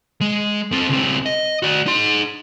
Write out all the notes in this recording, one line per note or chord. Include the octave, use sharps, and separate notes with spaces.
G#3
C4 A4
C#2 C4
D#5
F#4 D5
D#4 C6